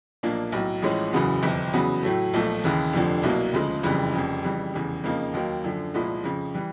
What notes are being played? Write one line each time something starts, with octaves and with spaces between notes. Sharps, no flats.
B1 A#2 F3 A#3 D4
B1 A2 F#3
A1 A2 F3 G#3 C#4
F#1 E2 C#3 F#3 B3
G1 F2 C3
E2 C#3 F#3 B3
A2 F#3 A3
B1 A#2 F3 A3
D#2 C#3 E3
F1 F2 D3 F3
C2 B2 F#3 A#3
D2 C#3 F3 G#3
F#1 F2 C#3 E3 G3
F1 F2 C#3
F2 C#3 E3 G3
F1 E2 C#3
F2 C#3 F3 A#3 D#4
D#2 D#3 F#3 A#3
F#2 D3 F3
C2 A#2 F3 G#3 B3
F2 C#3 F3
E3 G3